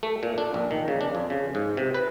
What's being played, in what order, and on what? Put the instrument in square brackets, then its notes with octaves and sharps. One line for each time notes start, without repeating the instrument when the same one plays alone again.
[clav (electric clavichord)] A3
A#2
D4
A#1
D#3
C#3
D4
F2
C#3
G#2
C3
B4